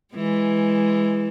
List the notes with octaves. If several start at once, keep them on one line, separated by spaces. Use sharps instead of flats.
E3 G#3